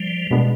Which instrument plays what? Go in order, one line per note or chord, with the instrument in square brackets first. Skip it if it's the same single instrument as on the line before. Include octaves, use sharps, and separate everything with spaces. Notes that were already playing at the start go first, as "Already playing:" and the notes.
Already playing: [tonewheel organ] F3 G3
[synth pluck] B2 G#3 B3 D4